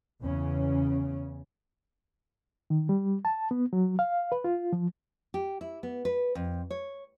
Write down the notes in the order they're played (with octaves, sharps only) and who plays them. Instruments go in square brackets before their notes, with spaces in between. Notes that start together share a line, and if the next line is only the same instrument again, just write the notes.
[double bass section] E2 C#3 C#4
[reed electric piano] D#3
G3
A5
B3
F#3
F5
B4
F4
F3
[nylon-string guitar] G4
E4
B3
B4
F2
C#5